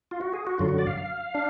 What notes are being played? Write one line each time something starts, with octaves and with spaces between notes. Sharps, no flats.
F4
F#4
G#4
F#4
F#2 D3 F#3 F4
F#4
D5
F5
F5
D4